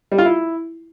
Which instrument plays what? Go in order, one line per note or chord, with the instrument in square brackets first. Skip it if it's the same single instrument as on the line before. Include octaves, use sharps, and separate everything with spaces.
[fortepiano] G3
F4
E4